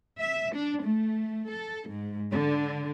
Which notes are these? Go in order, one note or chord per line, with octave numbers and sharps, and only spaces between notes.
E5
D4
A3
A4
G#2
D3